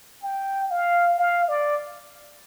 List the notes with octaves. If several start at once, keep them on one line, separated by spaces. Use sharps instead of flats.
G5
F5
F5
D5